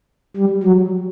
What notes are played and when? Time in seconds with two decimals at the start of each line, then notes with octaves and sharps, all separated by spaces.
0.36 G3
0.63 F#3